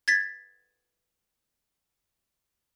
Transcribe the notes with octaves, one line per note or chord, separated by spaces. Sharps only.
G#6 A6 B6